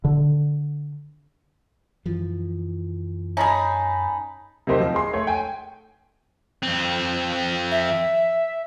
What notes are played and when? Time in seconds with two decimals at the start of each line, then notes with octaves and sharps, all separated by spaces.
0.04 D3
2.06 F#2 E3 F3
3.37 C#4 D#4 G#4 A5 B5
4.67 C3 F#3 A#3 D#4 G4 C5
4.80 F3
4.94 G#3 C6
5.13 A3 C#5
5.27 G5 G#5
6.63 F2 C4
7.71 E5